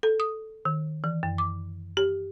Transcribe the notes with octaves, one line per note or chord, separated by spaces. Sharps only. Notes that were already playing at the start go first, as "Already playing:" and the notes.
A4
D#6
D#3
E3
F#2
D6
G4